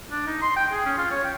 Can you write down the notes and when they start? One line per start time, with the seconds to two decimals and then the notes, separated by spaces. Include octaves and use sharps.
0.11 D4
0.27 D#4
0.42 C6
0.56 G5
0.72 G#4
0.86 C#4
0.98 F4
1.11 C#5
1.24 G5